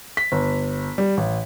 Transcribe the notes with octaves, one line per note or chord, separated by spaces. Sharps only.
B6
G1
G3
A1